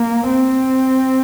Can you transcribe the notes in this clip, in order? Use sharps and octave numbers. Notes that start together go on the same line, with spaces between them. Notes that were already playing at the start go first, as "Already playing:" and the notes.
Already playing: A#3
C4